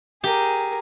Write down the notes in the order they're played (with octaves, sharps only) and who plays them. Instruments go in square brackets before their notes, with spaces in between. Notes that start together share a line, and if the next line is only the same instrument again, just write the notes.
[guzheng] G4 [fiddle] G#4 A#4